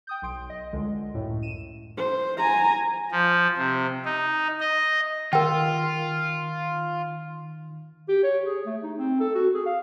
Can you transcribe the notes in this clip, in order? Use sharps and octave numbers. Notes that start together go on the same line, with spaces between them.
G5 D#6 G6
B1 C6 D7
D#5
C#2 D3 G#3
F#2 A2
D#7 E7
C5
G#5 A#5
F3
C3
D#4
D#5
D#3 F4 A#4 G5
G4
C#5
G#4
A3
D#4
C4
A4
F#4
G#4
F5